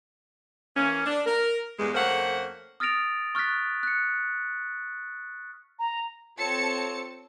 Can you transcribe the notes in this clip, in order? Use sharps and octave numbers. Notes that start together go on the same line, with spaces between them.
E3 A#3 C#4
D4
A#4
E2 G2 G#3
F2 A3 A#3 C#4 C5 F#5
D#6 F6 A6 A#6 D7 F7
C#6 F6 F#6 A6 B6
F#6 C#7
A#5
C4 F4 A4 C#5 A5 C#7